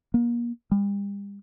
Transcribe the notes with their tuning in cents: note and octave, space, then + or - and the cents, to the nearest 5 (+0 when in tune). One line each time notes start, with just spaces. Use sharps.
A#3 +30
G3 +40